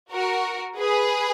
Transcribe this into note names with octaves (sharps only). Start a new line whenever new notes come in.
F#4 A#4
G#4 B4